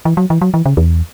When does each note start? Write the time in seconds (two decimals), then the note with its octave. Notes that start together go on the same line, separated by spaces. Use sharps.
0.05 E3
0.17 F#3
0.30 E3
0.41 F#3
0.54 E3
0.66 C#3
0.77 E2